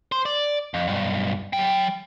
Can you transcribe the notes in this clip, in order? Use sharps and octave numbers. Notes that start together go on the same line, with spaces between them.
C5
D5
F2
B1 G2
F#3 G5